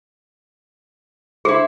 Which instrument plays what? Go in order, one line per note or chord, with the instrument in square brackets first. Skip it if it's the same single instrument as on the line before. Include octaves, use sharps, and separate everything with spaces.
[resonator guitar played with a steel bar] E4 C5 [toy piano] G#4